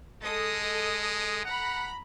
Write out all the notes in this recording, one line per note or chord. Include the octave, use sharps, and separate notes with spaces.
G#3 A4 D#5 D#6
F#5 A#5 B5